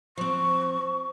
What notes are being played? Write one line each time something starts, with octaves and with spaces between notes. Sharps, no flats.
F3 C4 C#6